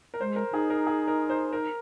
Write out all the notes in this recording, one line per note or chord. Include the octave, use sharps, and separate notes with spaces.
A#4
G#3 C5
A#4
D#4 G#4
A#4
G#4
A#4
C5
A#4